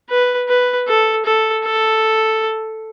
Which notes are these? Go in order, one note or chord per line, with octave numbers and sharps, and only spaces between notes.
B4
B4
A4
A4
A4